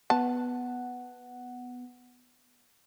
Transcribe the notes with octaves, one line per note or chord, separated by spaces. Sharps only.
B3 F#5 A5